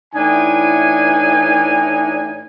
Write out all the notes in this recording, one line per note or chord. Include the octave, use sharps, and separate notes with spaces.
A2 E3 D4 D#4 G#5